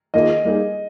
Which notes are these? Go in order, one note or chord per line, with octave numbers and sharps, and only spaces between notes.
D#3 A#3 F4 G#4 D#5
G3 A#3 D#4 G#4